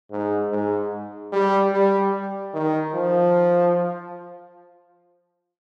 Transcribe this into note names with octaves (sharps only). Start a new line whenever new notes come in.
G#2
G#2
G3
G3
D#3
F3